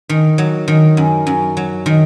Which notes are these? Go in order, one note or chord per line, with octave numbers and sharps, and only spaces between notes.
D#3
F#3
D#3
F#2
F#2
F#3
D#3